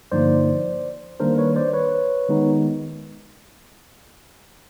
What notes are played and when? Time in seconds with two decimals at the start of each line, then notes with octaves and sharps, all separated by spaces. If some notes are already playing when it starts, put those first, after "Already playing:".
0.12 G2 D3 F3 A#3 D#4 C5 D5
1.20 D#3 G3 A#3 D4 A#4 C5
1.38 B4 C#5
1.56 C5 D5
1.73 B4 C#5
2.28 D#3 G#3 B3 D#4